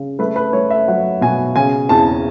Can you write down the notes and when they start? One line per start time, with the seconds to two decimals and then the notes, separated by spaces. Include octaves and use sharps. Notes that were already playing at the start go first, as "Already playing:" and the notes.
Already playing: C#3
0.19 A3 B4
0.36 B4
0.53 A3 C#5
0.70 E5
0.88 F#3 F#5
1.21 B2 G#5
1.56 C#3 G#5
1.89 E2 A5